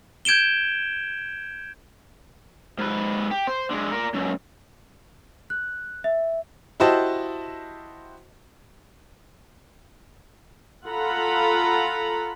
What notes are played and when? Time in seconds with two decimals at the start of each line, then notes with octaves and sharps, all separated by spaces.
0.25 G6 G#6 D7 E7 G7
2.79 G#2 B4
3.31 G4
3.47 C5
3.70 D3 G#3
3.92 A#4 D5
4.14 C#2 F#2
5.50 F#6
6.04 E5
6.80 E4 F#4 G4 C5 D#5 A5
10.88 F4 A4 F#5 A#5 B5